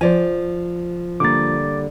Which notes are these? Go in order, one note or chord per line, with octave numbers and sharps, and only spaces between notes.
F3 C5 D5 G#5
D3 G3 A#3 D6 A6